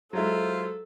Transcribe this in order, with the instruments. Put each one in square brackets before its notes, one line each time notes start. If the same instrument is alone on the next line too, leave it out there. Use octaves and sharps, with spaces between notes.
[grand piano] F#3 G#3 E4 [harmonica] F4 C5 [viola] A4